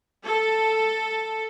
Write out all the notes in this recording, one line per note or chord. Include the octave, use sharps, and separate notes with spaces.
A4